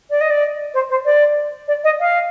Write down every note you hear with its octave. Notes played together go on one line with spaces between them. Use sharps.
D5
D#5
D5
C5
C5
D5
D5
D#5
F5